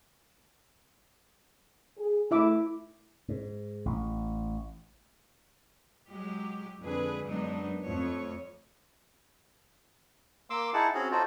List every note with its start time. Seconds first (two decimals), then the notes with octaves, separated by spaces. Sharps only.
1.97 G#4
2.31 A3 E4 E5 D6
3.29 G#2
3.86 A1
6.08 F#3 G#3 G4
6.81 F2 D3 G#3 G#4 B4
7.25 F#2 G#3 B3 D4 D#4
7.84 F2 A3 C#5
10.50 A#3 C6 D6 E6
10.74 D#4 E4 G#4 F#5 A5
10.94 C4 C#4 F#4 G#4 C#5
11.11 D#4 F4 F#4 A4 C5 D5